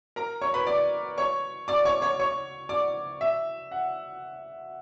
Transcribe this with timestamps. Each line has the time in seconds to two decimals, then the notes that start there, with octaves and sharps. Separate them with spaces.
0.16 A#4 A#5
0.42 C#5 C#6
0.54 B4 B5
0.67 D5 D6
1.18 C#5 C#6
1.68 D5 D6
1.85 C#5 C#6
2.02 C#5 C#6
2.20 C#5 C#6
2.69 D5 D6
3.21 E5
3.71 F#5